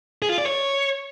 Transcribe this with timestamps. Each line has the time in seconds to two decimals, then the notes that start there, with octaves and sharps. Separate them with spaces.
0.22 G#4
0.30 F4
0.38 D5
0.46 C#5